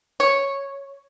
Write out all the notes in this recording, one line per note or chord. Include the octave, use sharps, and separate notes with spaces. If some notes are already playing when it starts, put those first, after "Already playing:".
C#5